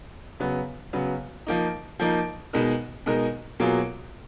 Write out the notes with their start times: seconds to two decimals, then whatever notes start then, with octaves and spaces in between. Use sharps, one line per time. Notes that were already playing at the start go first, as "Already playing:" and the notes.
0.40 C#3 F#3 B3
0.93 C#3 F#3 B3
1.47 F3 A#3 D#4
1.99 F3 A#3 D#4
2.53 B2 G#3 D#4 A#4
3.06 B2 G#3 D#4 A#4
3.60 B2 F#3 A#3 F4 G#4